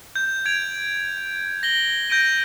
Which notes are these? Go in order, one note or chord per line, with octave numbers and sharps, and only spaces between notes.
G6
G#6 D7 F7
A#6 F#7 G7
G6 A#6 D7 D#7